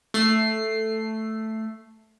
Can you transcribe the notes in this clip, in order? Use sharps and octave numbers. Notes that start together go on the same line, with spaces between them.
A3 C7